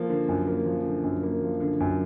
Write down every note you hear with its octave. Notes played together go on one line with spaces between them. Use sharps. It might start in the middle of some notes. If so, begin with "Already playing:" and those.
Already playing: F3 A#3
D3
F#2
A#3
F3
D3
F#2
A#3
F3
D3
F#2